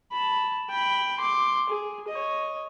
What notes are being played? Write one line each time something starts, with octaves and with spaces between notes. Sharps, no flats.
A5 B5
G5 B5
C6 D6
G#4
C#5 D#5